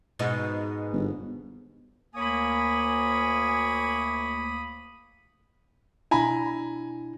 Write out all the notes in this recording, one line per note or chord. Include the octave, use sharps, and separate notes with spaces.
G#2 B2 D#4
G1
D2 A#3 A#4 C#5 G#5 B5 D#6
B2 D4 E4 G#5 A#5 B5